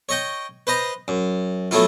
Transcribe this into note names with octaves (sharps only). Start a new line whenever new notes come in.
C#5 D#5 G5
B4 C5 D#5 A#5
F#2
F#3 A3 B3 E4 F4